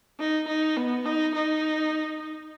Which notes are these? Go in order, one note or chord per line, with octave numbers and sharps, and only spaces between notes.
D#4
D#4
B3
D#4
D#4